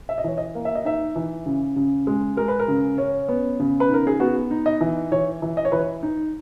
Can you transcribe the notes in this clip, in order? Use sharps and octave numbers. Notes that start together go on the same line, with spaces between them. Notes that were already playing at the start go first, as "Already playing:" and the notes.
E5
D#5
E3 C#5
D#5
A#3
E5
D#5
D#4 E5
E3
C#3
C#3
G#3
G#3 A#4
B4
A#4
C#3
C#4
B3
C#3
B4
D#4 A#4
G#4
B3 F#4
D#4
D#5
E3
E3 C#5
E3
D#5
C#5
E3 B4
C#5
D#4